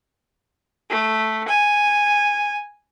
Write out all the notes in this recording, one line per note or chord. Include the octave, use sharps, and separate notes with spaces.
A3
G#5